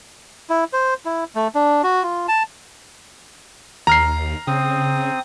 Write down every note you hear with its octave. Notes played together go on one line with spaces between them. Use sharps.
E4
C5
E4
A3
D4
F#4
F4
A5
D#2 A#5 F6 C7
C#3 C4 D#6